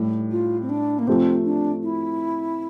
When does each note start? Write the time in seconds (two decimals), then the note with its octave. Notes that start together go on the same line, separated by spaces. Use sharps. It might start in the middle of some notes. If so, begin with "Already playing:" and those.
Already playing: A2 G3
0.31 F4
0.62 C4
0.69 D4
0.99 A#3
1.07 C3 F3 A3 C4
1.45 D4
1.83 E4